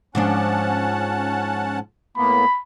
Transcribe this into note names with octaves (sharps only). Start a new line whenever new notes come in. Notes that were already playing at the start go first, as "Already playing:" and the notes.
G#2 F3 C#4 D4 F#5 A5
A2 A#3 B3 B5